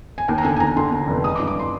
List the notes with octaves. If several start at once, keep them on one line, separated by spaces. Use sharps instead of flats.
G#5
D#2 G5
A#5
D3 G#5
G#5
D#2 A#5
D3 C6
D3
F1
G#3 D#6
D6
G2
D6
C6